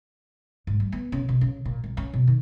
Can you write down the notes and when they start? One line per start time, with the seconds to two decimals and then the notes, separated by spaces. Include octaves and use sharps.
0.67 G#2
0.80 G3
0.92 B3
1.12 C#3
1.29 B2
1.41 C#3
1.65 A#2
1.84 C2
1.97 C#4
2.14 B2
2.27 D#3